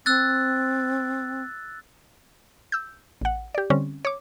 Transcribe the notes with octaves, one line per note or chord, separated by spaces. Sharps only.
C4 E6 F#6 A6
E6 G6
A1 F#5
G4 D5
D3 G3 C4 C#4
C#5 D6